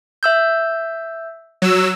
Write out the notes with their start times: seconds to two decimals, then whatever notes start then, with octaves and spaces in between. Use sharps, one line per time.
0.23 E5 E6 G6
1.62 F#3 E6